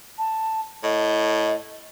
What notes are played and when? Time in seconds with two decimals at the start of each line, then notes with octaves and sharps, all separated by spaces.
0.18 A5
0.84 A2 D#5